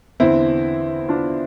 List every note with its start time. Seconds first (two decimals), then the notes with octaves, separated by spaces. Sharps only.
0.20 E2 D3 C4 E4
1.08 D4 F4